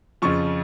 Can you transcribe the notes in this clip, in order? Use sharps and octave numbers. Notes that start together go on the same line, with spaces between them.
F2 C#3 F3 C#6